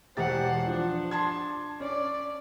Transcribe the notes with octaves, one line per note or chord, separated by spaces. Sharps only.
E1 G4 C5 F#5 A6
F3 D4
A5 C6 G#6
C#4 D5